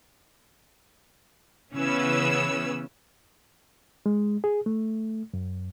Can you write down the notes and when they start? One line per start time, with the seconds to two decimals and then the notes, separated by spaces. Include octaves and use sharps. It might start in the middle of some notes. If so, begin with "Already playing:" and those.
1.75 C#3 E3 B3 C#4 B4 E6
4.06 G#3
4.44 G#4
4.66 A3
5.34 F#2